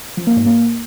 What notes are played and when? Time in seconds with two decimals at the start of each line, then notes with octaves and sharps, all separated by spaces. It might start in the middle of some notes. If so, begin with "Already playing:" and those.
0.17 F3
0.27 A#3
0.36 G#2
0.46 A#3